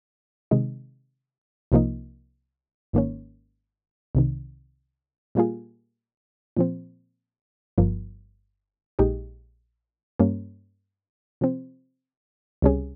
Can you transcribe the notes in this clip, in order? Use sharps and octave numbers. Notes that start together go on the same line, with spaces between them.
C3 D#3 G#3 D#4
C2 C3 F3 A#3 D#4
G#1 G#2 D#3 A#3 C#4
C2 C3 D#3
A#2 G3 A#3 F4 G#4
A#2 F3 C4
G1 G2 F3 A#3
A#1 A#2 G#3 D#4 G4
G2 G3 A#3 C#4
C3 F3 C4
C#2 C3 G3 C#4 G#4